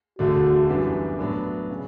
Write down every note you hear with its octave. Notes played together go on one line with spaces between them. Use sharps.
E1 D2 D3 A3 D4 F#4
F#2 E3 G3 B3 D4
A2 F#3 B3 D4
C#3